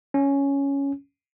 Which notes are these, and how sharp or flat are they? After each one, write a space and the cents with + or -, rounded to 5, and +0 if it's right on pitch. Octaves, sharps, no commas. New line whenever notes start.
C#4 +5